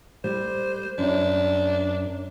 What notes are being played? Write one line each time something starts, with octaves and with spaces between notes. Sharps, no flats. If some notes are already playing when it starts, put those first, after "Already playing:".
G3 C5
F#2 D4